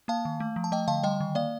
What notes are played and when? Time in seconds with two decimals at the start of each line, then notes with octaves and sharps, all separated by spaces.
0.08 A#3 F5 A5
0.25 D#3
0.40 A3
0.56 F3
0.64 A5
0.72 A3 D#5 G5
0.88 D3 F5 A5
1.03 G3 D#5 G5
1.20 D#3
1.35 A#3 D5 F5